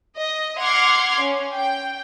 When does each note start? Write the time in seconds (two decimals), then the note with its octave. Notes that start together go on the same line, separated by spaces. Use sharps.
0.18 D#5
0.60 F#5 C6 D6 F6 G#6 C7
1.21 C#4
1.53 G5